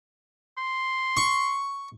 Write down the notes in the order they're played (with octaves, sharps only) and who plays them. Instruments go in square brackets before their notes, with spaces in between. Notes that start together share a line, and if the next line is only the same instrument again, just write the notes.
[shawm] C6
[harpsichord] C#6